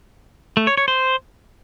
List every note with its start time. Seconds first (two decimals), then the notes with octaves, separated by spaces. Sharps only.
0.57 A3
0.67 C#5
0.77 C#5
0.88 C5